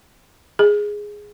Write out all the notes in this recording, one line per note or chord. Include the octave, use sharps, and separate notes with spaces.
G#4